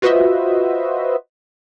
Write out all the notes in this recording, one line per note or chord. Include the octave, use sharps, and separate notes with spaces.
F4 F#4 B4 C5 D#5 E5